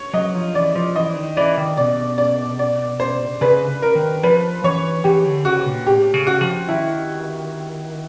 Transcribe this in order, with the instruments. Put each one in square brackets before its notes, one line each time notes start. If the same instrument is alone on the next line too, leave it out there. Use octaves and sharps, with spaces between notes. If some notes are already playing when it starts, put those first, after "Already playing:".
Already playing: [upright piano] C#5
[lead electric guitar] F#3 [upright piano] D#5
[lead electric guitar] F3
[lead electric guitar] E3 [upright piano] D5
[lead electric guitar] F3
[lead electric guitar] E3 [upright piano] D#5
[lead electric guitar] D#3
[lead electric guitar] E3 [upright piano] D5
[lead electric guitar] D#3
[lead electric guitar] B2 [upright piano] D5
[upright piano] D5
D5
C5
[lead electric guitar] C#3 [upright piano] B4
[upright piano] A#4
[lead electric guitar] D#3
[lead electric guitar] F3 [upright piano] B4
[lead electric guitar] E3 [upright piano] C#5
[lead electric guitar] E3 [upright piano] G4
[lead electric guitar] D3
[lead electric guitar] C#3 [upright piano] F#4
[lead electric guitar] A#2
[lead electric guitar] A2 [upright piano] G4
[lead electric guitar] C#3
[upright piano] F#4
[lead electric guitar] F3
[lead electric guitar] D#3 [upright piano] E4